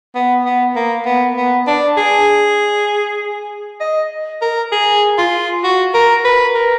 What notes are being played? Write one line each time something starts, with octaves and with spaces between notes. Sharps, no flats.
B3
B3
A#3
B3
B3
D4
G#4
D#5
A#4
G#4
F4
F#4
A#4
B4
A#4